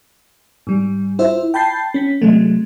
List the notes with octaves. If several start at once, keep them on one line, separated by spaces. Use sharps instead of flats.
G#2 G3
E4 F4 C5 E5
G5 A5 B5 G6 A6 C7
C#4 B6
C3 F#3 G#3 A3